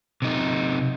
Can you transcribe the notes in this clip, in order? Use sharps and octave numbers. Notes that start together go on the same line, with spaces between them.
C3 D#4